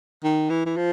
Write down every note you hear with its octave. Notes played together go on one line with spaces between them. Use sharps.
D#3
E3
E3
F3